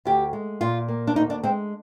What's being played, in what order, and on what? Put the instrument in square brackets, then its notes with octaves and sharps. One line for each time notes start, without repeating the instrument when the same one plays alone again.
[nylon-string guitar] D2 G4
G#3
A#2 F4
A#3
D4
D2 D#4
D4
G#3 C4